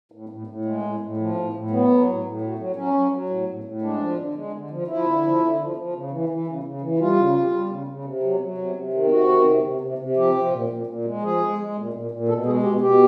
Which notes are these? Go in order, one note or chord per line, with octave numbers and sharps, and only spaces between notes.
A2
A2
A2
G#3
A2
A2
F3
A2
A2
F#3 B3
F#3
A2
A2
F#3
F#3
F#3 C#4
F#3
F#3
A2
A2
A2
G#3 D4
F3
D3
G#3
D3
F3
F3 E4
D3
F3
D3
F3
F3
C#3
E3
E3
C#3
C#3
E3
G3 F4
C#3
G3
G3
C#3
C#3
C3
F#3
F#3
C3
C3
D#3
C3 F#4
D#3
C3
C3
C3
C3
F3 G4
F3
A#2
A#2
A#2
G#3
F3 G#4
G#3
G#3
A#2
A#2
A#2
B2 A4
G#3 G#4
B2 G4
B2 G4